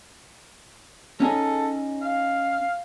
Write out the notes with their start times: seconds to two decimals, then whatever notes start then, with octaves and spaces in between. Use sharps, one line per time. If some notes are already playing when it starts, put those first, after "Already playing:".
1.20 C#4 D#4 G#4 A4
2.02 F5